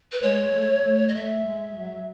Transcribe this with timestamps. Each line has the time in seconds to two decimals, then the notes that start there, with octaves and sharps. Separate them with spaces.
0.12 B4
0.21 G#3 C#5
0.53 A3
0.83 A3
1.08 D#5
1.14 A3 E5
1.45 G#3
1.75 F#3